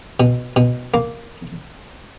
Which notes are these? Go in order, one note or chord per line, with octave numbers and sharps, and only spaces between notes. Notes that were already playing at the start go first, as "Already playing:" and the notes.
B2
B2
A#3